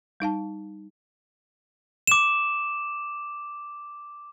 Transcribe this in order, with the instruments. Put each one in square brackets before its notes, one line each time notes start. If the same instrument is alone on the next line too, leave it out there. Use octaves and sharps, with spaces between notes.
[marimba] G3 D#4 F5 A5
[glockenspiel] D6 E7